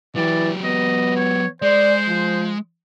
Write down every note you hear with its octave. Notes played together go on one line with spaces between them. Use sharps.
E3 F#3 G4 D5
B3 D#5
C#5
G#3 C5 D5
F3